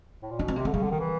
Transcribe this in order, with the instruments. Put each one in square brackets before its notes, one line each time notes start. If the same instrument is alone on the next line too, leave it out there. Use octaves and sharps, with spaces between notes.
[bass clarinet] A2
A#2
[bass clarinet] B2 [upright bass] D4
[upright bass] C4
[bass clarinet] C3 [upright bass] A#3
[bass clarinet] D3 [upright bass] C4
[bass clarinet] C#3 [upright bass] G3
[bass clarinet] D3
D#3
E3